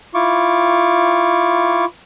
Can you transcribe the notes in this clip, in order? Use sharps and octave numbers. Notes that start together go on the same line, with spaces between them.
E4 F4 C#6 D6